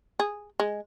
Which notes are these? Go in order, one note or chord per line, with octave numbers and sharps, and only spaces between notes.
G#4
G#3